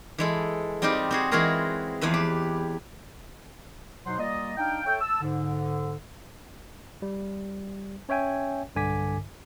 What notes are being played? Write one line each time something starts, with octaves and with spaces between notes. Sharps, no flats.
E3 G#3 A4
G3 C4 D#4 F4 G4
C4 F#4 G#4
E3 G#3 F4 F#4 G#4 A#4
E2 F3 B4 E5
G4
B2 F#3 D#4 C5 F#5 C6
G3 A#3 F4 D5 D#5
D4 D#4 F5 G5
A4 C#5 E5 G5
A5 E6
G#2 D3
G3
C#4 C#5 E5 G5 G#5
B1 G2 D3 G#5 D6 B6